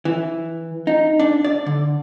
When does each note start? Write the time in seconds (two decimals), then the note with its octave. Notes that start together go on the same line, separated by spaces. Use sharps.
0.05 E3
0.87 D#4
1.19 D4
1.44 D5
1.66 D3